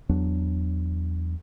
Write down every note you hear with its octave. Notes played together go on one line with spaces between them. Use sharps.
E2 F#3 B3 D4